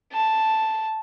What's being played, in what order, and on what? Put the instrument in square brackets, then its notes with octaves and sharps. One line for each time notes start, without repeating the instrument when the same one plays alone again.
[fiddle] A5